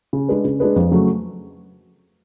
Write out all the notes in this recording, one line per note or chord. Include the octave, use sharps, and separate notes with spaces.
C#3
G#3 D4 G#4 B4
C#3
G#3 D4 G#4 B4
F2
C#3 F#3 A3